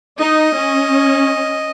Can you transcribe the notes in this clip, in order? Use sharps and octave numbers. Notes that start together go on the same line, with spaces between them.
D#4 D#5
C#4